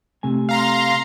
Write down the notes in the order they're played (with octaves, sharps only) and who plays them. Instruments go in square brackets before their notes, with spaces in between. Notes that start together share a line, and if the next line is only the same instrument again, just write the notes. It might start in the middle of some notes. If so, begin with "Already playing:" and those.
[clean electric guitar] C3 A3 G#5
[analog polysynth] F5 A#5 C6